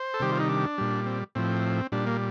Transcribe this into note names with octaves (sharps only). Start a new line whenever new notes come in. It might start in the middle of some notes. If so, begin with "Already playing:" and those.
Already playing: C5
A4
C3 D#3 G3 G4
F4
D#4
D4
A#2 G3
C4
A2 F3 C4
A#2 G3 D4
A#3